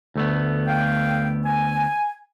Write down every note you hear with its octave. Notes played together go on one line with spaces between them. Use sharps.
D2 A3 B3
F5 G5
G#5